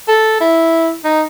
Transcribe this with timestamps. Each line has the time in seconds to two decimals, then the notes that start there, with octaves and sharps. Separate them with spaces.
0.08 A4
0.40 E4
1.04 D#4